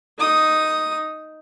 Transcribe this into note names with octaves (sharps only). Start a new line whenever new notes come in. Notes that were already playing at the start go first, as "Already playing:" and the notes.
D#4 D#6